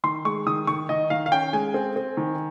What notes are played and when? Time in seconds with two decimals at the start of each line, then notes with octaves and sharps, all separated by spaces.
0.04 D#3 C6
0.25 G#3 C#6
0.47 D#3 D#6
0.67 D#3 C#6
0.89 D#3 D#5
1.10 D#3 F5
1.26 F5
1.32 C#4 G5
1.53 G#3 G#5
1.74 C4
1.96 C4
2.17 D#3